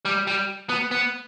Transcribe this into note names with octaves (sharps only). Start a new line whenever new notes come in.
G3
G3
B3
B3